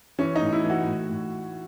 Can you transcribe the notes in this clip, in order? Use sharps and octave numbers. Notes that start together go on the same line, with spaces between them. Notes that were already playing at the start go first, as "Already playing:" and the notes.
E3 C#4
D#4
A2
E4
E3
F#4
A2
A2